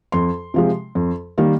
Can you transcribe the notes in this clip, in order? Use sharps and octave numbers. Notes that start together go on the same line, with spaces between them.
F2 C6
C3 F3 G#3
F2
D#3 G3 A#3